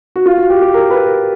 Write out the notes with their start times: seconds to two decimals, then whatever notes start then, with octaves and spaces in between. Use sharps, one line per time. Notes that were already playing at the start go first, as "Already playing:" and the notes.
0.16 F#4
0.26 F4
0.37 F#4
0.50 G4
0.61 G4
0.74 A#4
0.90 B4
1.07 A#4